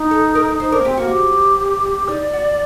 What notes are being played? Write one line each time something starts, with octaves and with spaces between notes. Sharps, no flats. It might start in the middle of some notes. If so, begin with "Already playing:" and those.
Already playing: D#4
A4
A#4
D#4 C5
D4 A#4
A#3
C4 G4
A#3 F#4
G4
D#4 D5
F#4